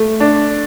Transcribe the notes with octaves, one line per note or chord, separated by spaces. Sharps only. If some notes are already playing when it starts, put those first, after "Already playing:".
Already playing: A3
D4